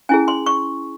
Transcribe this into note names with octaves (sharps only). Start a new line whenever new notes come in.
C#4 E4 G#4 G#5
C6
C#6